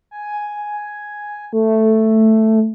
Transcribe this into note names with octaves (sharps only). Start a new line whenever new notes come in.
G#5
A3